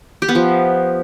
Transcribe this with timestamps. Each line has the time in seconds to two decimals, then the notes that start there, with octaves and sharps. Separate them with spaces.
0.22 G4
0.29 B3
0.35 F3